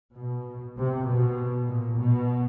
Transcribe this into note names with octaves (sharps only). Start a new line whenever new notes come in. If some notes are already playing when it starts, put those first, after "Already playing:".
B2
C3
B2
A#2
B2